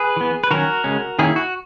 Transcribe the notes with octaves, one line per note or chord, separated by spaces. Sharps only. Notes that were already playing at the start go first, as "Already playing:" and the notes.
Already playing: G#4 B4
E3 B3
B4
D#3 F#3 C#4 F#4 A#4
C#3 G#3 C#4
D#3 A#3 C#4 E4 G#4
F#4